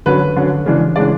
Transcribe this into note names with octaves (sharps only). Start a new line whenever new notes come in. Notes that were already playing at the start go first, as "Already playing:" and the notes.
D3 F#3 C#4 B4
D3 F#3 C#4
C#3 E3 G#3 D4
C#3 E3 G#3 D4 D5